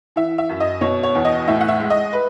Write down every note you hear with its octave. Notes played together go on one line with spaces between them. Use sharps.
E3 E5
E5
F#2
D#5
B2 C#5
C#5
E2
D#5
A2 E5
F#5
E5
G#3
D#5
B4